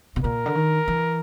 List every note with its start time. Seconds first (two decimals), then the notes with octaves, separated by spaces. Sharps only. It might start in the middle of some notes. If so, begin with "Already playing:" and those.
0.16 B2
0.24 A#2 A#4
0.46 D3
0.55 D#3
0.88 E3